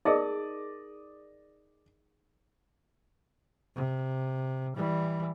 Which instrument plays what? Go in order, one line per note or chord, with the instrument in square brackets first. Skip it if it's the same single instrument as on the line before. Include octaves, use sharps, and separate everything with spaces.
[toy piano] D#4 G#4 A#4 [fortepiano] D5 D#5
[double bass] C3
E3 G3